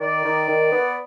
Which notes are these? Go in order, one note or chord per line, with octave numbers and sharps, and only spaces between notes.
D#3 D5
D#3
D#3
B3